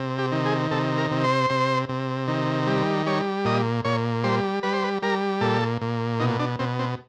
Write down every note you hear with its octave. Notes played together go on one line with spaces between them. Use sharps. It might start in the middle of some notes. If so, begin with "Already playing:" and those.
Already playing: C3
G4
D#3
G#4
C3 A4
A#4
C3
C5
C3
C3
D#3
G3
G3 C#5
A#2 D#5
A#2 C#5
G3 C5
G3 B4
C5
B4
G3 A#4
A#2 A4
A#2
B2 D#4
D4
B2 C4
C4